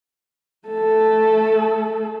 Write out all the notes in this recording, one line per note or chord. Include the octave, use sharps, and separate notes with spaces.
A3 A4